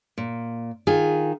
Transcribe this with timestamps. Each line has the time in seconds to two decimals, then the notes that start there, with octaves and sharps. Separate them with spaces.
0.18 A#2
0.87 D#3 F4 G#4